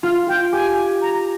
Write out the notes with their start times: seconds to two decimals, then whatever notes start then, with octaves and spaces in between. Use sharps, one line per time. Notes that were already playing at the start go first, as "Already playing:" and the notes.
0.03 F4 F5
0.28 F4 G5
0.52 G4 G#5
1.02 A#5